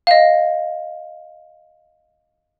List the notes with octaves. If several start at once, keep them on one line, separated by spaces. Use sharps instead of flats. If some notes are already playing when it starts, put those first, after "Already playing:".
D#5 F5